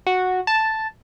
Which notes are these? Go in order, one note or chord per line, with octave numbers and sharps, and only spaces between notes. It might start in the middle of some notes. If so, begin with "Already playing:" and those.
F#4
A5